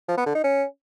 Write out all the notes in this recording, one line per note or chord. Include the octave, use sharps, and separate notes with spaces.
F3
B3
D3
D#4
C#4